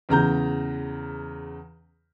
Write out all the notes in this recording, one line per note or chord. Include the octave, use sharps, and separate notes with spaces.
E2 C#3 A#5 G6